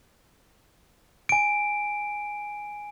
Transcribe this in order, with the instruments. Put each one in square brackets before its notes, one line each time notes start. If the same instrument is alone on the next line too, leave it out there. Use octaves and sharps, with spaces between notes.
[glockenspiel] G#5 D7